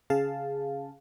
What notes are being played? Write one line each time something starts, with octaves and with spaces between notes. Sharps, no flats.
C#3 G#4 F5 A5